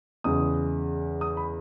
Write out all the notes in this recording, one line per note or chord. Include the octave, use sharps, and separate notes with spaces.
E2 C#3 G#3 D#6
D#6
B5